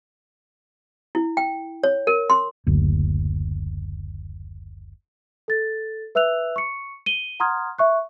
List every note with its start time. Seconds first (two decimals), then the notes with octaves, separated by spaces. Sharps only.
1.15 E4
1.37 G5
1.83 C#5
2.07 A#4
2.30 C6
2.67 F#1 D2
5.48 A4 A6
6.15 B4 E5 E6 F#6 F7
6.56 C#6 C#7
7.06 D#7 G7
7.40 F#5 A#5 C6 D#6 F6 G#6
7.78 E5 C#6 F#6